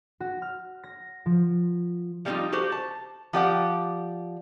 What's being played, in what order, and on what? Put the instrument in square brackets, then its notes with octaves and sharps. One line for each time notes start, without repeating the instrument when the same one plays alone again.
[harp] F#4
F6
A#6
F3
[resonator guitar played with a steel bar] F3 G3 A#3 C4 D#4 F4
F#4 G4 A4 C5
A5
F3 G4 D5 F#5